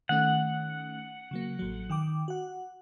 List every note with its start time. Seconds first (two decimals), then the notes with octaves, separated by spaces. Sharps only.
0.09 D#3 A3 C#4 F#5
1.31 C#3 F#3 A#3
1.59 A1 F#3
1.90 D#3 G5 D6
2.28 F#4 F#5